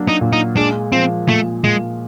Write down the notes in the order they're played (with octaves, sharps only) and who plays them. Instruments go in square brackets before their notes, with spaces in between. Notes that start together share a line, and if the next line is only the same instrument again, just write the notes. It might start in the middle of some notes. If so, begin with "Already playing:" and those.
Already playing: [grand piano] F#3 A#3 D4
[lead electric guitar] D#4
[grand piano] A#2
[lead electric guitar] D#4
[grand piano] G#3 [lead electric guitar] D4
[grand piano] F3 [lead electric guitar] C4
[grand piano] A#2 [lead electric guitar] A3
[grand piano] A#2 [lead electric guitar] G#3